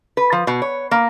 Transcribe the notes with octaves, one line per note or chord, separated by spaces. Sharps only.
B4
F3
B2
C#5
A#3